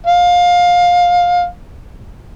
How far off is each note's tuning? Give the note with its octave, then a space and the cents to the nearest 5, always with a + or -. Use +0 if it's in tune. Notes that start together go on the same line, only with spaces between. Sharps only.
F5 +20